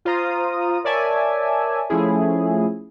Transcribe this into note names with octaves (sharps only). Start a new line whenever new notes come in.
F4 C5 A#5 D#6
A#4 C#5 D5 E5 G#5 A5
F3 A3 C#4 E4 G#4